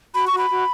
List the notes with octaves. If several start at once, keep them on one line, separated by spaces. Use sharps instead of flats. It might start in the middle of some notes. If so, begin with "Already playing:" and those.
F#4 B5
C#6
F#4 B5
F#4